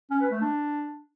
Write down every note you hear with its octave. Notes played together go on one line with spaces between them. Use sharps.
C#4
B4
A3
D4